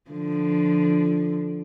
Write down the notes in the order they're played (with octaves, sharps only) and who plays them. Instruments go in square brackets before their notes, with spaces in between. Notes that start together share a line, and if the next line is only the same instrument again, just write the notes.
[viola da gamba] D3 F3